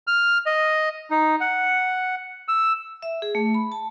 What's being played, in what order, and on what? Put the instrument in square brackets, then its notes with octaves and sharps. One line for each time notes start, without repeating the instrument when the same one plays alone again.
[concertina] F6
D#5
D#4
F#5
E6
[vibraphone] E5
G#4
A3
B5
A5